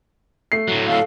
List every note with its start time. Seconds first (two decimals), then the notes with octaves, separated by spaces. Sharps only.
0.52 A3 C7
0.68 A2 F#3
0.88 A4 F5